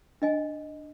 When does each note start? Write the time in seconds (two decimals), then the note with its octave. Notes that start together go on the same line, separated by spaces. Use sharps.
0.22 D4 D#5 G#5